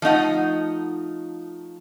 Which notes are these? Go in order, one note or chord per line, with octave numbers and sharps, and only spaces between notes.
F3 A3 D#4 F#5